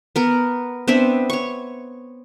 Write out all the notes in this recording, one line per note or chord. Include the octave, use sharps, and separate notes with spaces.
B3 A#4
B3 C4 D4 E5
C#5 C#6